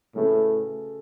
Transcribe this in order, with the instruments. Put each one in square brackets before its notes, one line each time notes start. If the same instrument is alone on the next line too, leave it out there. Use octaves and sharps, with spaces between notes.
[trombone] A2 [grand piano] C#3 A3 F#4 B4